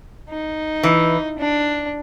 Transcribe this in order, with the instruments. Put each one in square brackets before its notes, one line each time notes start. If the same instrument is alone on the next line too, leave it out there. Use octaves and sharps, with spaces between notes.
[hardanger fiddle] D#4
[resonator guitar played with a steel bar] E3
[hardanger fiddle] D4